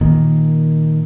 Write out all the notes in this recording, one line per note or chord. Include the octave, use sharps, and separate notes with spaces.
A#2 D#3 A#3